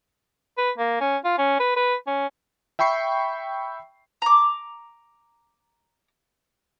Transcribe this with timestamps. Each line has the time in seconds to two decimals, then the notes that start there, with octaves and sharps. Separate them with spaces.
0.58 B4
0.78 A#3
1.01 C#4
1.25 F4
1.38 C#4
1.60 B4
1.77 B4
2.07 C#4
2.79 E5 G5 B5 C#6 C7
4.22 A#5 D6